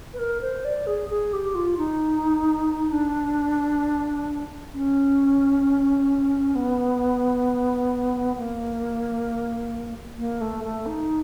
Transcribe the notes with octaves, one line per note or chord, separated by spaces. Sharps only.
B4
A#4
C5
D5
G#4
G#4
G4
F4
D#4
D4
C#4
B3
A#3
A#3
A3
A3
D#4